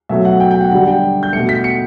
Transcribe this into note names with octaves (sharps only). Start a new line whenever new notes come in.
B2 F#3 A3 E5
F#5
G5
G5
F#5
D3 G3 F#5
G5
G6
B2 A3 C#7
B6
C#7